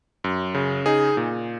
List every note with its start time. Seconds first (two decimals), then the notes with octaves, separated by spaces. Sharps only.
0.24 F#2
0.54 C#3
0.86 D#4 G#4
1.17 A#2